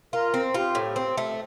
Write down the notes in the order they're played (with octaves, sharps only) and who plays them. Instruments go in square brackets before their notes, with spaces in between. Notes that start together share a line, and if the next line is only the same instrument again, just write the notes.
[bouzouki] F4 [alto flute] A#4
[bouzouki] C4
[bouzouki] F4 [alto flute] G4
[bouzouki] A2
C4
A3